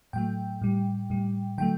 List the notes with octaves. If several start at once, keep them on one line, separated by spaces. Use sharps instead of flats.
A2 F#3 A3 G5
A2 G3
A2 G3
D3 F#3 A3 G5